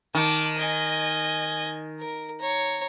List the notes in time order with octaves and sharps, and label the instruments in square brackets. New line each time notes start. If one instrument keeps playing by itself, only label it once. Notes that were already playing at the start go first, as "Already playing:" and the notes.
[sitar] D#3 [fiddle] A5 D6
[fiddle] D#5 G#5
A#4
C#5 A#5